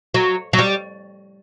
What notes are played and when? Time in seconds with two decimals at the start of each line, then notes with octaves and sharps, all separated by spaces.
0.14 F#3
0.53 F#3
0.59 G3